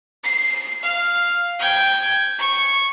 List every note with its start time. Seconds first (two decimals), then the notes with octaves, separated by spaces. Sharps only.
0.24 C7
0.84 F5
1.59 G5 G#6
2.39 C#6